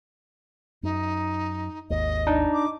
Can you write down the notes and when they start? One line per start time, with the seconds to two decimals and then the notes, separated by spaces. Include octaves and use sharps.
0.83 F#2 D#4
1.90 G#1 D#2 D#5
2.27 D4 D#4
2.54 D6